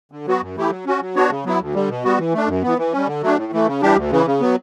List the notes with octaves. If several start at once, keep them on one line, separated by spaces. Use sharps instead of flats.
D3
F#3 B3 F#4
F#2
E3 A3 E4 G4
F#3
C#4 F#4
F#3
B3 D4 F#4 C#5
C#3
F#3 B3 E4
D2
D3 G3
B2
G3 B3 F#4
E3
A3 D4
F#2
E3 B3
E3
G3 C#4
D3
F#3 A3 D4
A2
E3 A3
C#3
E3 G3 D4 G4
D2
C#3 E3
C#3
F#3 B3